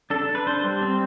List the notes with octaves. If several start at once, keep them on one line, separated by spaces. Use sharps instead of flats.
D4 A4
D4
B4
D4 C5
G3
C4